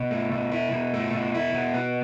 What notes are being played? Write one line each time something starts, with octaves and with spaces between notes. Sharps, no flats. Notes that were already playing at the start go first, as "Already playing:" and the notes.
Already playing: B2
A3
B2
E4
B2
A3
B2
E4
B2
B3